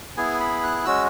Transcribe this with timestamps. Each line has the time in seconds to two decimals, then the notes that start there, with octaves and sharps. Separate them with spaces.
0.17 B3 E4 G#4 G#5
0.40 B5
0.63 F#6
0.85 G#3 C#4 F#4 E6